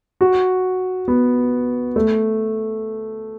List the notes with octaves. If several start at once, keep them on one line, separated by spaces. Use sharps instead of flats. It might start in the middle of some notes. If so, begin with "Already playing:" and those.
F#4
B3
A3